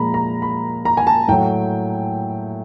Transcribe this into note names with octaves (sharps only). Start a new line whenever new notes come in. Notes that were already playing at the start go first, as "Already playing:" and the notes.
Already playing: A#2 F3 G#3 A#5 B5
A#5
B5
A#5
G#5
A5
A2 F#3 G5